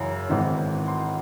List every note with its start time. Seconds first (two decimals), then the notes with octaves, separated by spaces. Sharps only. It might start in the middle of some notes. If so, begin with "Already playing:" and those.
Already playing: F#2 C#3 E3
0.29 G#1 G#2 E3
0.88 C6